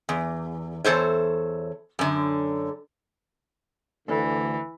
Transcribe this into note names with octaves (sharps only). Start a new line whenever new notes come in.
E2
E2 A4 C5 C#5
F#2 D3
D2 D3 E3